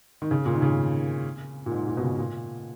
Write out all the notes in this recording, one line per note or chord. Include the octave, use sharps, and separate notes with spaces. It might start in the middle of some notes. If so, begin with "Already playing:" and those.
D#3
C#3
A#2
D#3
C#3
A#2
G#2
A#2
B2
C#3
A#2